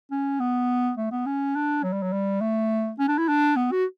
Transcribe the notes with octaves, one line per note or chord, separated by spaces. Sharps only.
C#4
B3
A3
B3
C#4
D4
F#3
G3
F#3
G3
A3
C#4
D4
E4
D4
B3
F#4